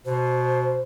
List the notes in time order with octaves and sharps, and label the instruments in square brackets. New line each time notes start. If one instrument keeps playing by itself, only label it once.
[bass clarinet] B2 [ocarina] C5